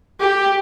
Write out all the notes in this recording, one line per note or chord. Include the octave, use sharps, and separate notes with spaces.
G4